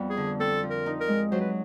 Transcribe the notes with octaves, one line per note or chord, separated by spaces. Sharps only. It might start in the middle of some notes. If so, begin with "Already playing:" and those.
Already playing: F2 G3 B3
G#4
D3
C4 A4
F3
A#4
D#4
A#4
G#3
F#3 C5
B4